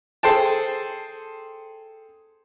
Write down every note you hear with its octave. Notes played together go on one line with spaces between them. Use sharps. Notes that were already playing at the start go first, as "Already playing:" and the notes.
G#4 A4 C5 G5 A5